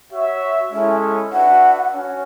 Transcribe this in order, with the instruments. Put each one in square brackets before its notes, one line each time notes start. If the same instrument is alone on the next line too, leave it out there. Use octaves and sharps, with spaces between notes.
[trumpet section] F#4 C#5 E5
[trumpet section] G#3 C#4 E4 A4 [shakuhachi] E5
[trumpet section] D4 F#4 B4 E5 [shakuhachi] F#5
[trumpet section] C#4 F#4